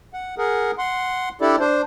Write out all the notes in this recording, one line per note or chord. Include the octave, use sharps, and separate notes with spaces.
F#5
G#4 A#4 F#5
F#5 C6
D4 E4 G4 A4 D5
D4 C5